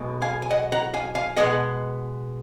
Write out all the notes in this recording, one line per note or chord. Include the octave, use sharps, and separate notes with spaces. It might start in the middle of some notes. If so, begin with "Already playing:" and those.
Already playing: B1 B2 G#3
F5 G#5
G#5
D#5 F#5
F#5 A#5
F5 G#5
F5 G#5
B2 G#3 B3 D#5 F#5